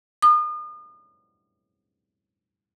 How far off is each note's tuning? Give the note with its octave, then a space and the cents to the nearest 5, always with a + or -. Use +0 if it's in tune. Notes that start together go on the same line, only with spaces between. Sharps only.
D#6 -40